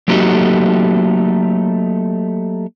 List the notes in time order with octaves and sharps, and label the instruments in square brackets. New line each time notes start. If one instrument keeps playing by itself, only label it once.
[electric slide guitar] F#3 A3 A#3 D#4 F#4 G4